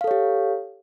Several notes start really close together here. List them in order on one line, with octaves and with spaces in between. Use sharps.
F5 A4 C#5 G4